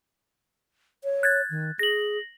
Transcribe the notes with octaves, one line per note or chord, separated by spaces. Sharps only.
C#5
F#6 G#6 A6
D#3
G#4 A#6 F#7